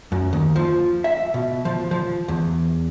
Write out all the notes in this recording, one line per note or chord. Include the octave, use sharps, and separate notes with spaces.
F#2
D#2
F3
E5
B2
F3
F3
E2